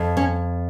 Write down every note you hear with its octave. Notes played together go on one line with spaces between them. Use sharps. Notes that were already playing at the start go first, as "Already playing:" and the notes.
Already playing: F2
C#4